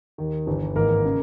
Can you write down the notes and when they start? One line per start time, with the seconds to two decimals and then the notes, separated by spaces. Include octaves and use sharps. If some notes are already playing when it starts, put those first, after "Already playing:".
0.18 D#2 D#3
0.47 G1 G2 E3
0.76 G#1 G#2 E3 A#3 A#4
1.05 C#3